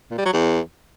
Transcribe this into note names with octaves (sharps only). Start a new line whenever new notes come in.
A#2
G3
F#3
E2